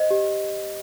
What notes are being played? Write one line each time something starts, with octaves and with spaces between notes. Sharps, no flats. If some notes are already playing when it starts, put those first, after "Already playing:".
Already playing: C5 D#5
G4